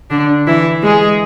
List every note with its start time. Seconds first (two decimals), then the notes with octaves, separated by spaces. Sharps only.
0.10 D3 D4
0.47 E3 E4
0.83 G#3 G#4